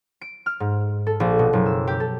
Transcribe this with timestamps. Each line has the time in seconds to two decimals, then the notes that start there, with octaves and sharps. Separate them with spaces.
0.21 D7
0.46 F6
0.60 G#2
1.07 A4
1.20 A#1
1.39 B2
1.53 F#1
1.66 E6
1.87 G4
2.00 A4